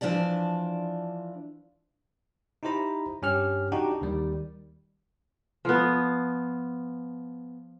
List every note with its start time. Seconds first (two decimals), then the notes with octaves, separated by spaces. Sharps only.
0.01 E3 F3 D4 D5 A5
2.63 D#4 E4 G4 C5 A#5 B5
3.22 G2 C#4 G4 F6
3.72 D4 D#4 F#4 G4 F#5 G5
4.01 D#2 D#3 G3
5.65 F3 B3